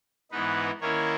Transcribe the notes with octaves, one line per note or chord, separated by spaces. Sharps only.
G#2 E3 B3 D#4 B4
D#3 A#3 C#4 E4 C#5